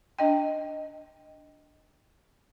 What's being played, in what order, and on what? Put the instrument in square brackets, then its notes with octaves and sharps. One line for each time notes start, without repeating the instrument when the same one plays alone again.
[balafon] D4 D#5 G5